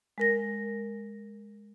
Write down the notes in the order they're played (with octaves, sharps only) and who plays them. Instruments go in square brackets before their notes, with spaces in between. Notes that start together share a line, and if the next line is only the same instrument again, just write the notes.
[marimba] G#3 A#4 A#6